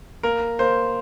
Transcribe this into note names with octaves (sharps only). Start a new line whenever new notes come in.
A#3 A#4
A#3 C5